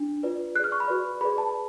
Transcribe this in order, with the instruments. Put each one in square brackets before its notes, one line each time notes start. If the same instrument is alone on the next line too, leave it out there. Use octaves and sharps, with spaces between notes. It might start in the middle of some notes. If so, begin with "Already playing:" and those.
Already playing: [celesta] D4
F4 B4 D5
G#4 F#6
D5 F6
C#6
B5
F#4 B4 D5
G#4 B4 D5 B5
A5